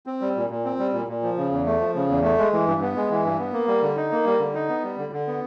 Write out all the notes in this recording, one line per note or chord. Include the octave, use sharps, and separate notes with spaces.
C4
G3
A#2
A#2
C4
G3
A#2
A#2
F3
C#3
E2
A3
F3
C#3
E2
A3
G#3
E3
G2
B3
G#3
E3
G2
B3
A#3
G3
D3
D#4
A#3
G3
D3
D#4
B3
G3
D3
D3
B3